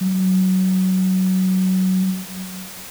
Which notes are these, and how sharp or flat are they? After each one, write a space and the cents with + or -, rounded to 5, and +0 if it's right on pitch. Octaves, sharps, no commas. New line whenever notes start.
F#3 +15